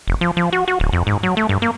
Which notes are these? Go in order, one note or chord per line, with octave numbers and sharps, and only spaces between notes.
F1
F3
F3
F#4
F#4
D1
F2
G#2
F#3
A3
G2
A#3